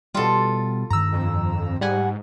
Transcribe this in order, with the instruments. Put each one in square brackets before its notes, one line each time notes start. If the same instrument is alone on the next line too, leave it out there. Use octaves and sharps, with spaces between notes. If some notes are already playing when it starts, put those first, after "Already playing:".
[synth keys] B2 G3 [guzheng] F4 A4
[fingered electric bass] G2 D#3 [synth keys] A#5 E6
[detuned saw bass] F2
[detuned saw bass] G#2 [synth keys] G3 F#5 G#5